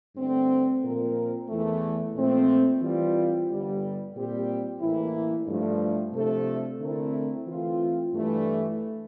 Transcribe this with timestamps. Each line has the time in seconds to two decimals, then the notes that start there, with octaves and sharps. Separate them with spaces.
0.15 G2 D3 A3 C4
0.82 A#2 F3 C4 F4 A#4
1.48 E2 E3 A3
2.15 A#2 F3 A3 C4
2.82 E3 G3 C4 F4
3.49 G1 G2 D3 G3
4.15 A#2 G3 C4 G4
4.81 A1 A2 E3 A#3 E4
5.47 G2 F3 A3
6.13 C3 F3 A3 D4 A4
6.80 D3 A3 C4 E4 A#4
7.47 E3 A3 C4 F4
8.13 G2 E3 A3